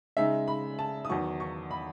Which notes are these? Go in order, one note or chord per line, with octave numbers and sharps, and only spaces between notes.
C#3 G#3 D#4 E5
B5
A5
D#6
E2 D#3 F#3 C#6
C#6
B5